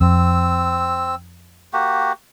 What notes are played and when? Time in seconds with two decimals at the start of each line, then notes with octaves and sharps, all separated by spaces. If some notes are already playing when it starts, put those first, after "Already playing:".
0.01 F2 C4 E6
1.73 A#3 F#4 G4